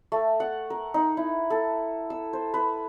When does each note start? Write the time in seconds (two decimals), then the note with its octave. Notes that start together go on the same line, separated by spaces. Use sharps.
0.12 A3
0.40 F#5
0.70 A#4
0.94 D#4
1.17 E4
1.50 A4
2.10 E6
2.33 C5
2.54 B4